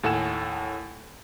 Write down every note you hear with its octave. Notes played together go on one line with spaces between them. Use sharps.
D#2 A2 A4 F#5 G#5 E7